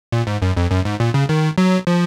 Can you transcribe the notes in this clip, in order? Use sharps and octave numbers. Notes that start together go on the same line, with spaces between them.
A#2
G#2
F#2
F2
F#2
G#2
A#2
C#3
D#3
F#3
F3